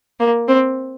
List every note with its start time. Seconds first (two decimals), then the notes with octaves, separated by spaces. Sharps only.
0.20 A#3
0.48 C4